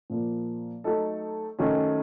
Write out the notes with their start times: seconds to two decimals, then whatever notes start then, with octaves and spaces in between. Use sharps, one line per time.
0.10 A#2 F3 A#3
0.84 F#3 A3 D#4 A4
1.59 D#3 F#3 A3 C#4